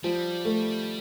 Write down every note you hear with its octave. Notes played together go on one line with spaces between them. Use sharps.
F3 G3
A3